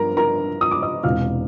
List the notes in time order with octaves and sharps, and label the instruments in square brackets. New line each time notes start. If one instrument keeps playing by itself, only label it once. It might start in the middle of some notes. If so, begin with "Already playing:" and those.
Already playing: [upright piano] G2 F3 A#4 A#5
A#4 A#5
D#6
D6
D#5 D#6
E1 E2 C3 F5 F6